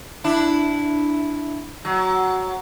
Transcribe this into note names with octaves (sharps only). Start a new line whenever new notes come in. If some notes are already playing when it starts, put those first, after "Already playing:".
D4 E4
F#3